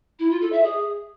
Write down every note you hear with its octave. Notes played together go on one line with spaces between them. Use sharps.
E4
F4
A4
E5
G#4